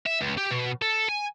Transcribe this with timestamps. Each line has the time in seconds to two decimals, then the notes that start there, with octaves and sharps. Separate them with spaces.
0.06 E5
0.21 C#2
0.38 G4
0.51 B2
0.82 A4
1.09 G#5